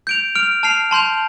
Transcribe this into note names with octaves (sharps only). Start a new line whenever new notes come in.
G6 D7 F7
F6 D7 F7
A5 F6 C7 F7
A5 C6 G6 F7